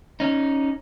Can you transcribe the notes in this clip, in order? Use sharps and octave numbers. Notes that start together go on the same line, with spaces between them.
C#4 D#4